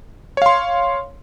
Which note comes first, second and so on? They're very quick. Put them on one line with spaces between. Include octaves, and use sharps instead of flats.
C#5 F5 C6